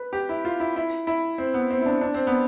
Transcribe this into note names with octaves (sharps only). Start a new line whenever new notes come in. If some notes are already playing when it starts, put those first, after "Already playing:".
Already playing: B4
G4
E4
F4
E4
E4
E4
C4
B3
C4
E4
D4
D4
C4
B3